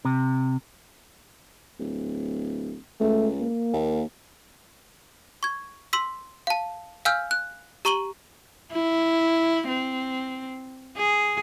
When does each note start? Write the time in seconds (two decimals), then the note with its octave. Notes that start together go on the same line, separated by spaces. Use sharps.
0.05 C3
1.79 D1
3.00 C#2 A3
3.40 A#3
3.73 D#2
5.43 C#6 G#6
5.93 C6 E6 B6
6.47 F5 A5
7.05 F5 G#5 E6 F6 G6
7.31 F#6
7.85 G4 A#5 C#6 D#7 F#7 G7
8.73 E4
9.68 C4
10.97 G#4